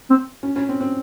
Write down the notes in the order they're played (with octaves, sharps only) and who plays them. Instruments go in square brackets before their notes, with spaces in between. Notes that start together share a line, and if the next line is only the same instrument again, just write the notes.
[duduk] C4
[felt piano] C#4
C#4
C4
C4